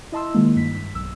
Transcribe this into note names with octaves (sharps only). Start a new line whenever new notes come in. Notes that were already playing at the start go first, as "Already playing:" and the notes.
E4 D#5 A5 C6 E6
D#3 G#3 A#3
G2 B6
B1 E6